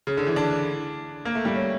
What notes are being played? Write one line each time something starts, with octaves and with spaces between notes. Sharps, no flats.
C#3
D3
E3
D4
A#3
A3
G3
C#4